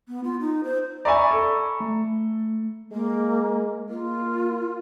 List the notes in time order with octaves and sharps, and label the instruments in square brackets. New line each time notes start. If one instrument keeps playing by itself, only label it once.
[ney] B3
F4
D#4
C5
[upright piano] D5 E5 G#5 [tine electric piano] A#5 B5 C#6
[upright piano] A4
[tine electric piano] A3
[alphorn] G#3 [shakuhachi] A#3
[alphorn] A#3 [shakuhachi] F4